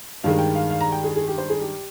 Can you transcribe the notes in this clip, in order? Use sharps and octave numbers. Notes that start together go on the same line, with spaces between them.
G2 D#3 G#3 F5
G5
F5
F5
A#5
G5
G#4
G#4
G4
C5
G#4
G4